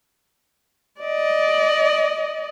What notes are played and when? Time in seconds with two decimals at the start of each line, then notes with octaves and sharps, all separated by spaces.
1.01 D5 D#5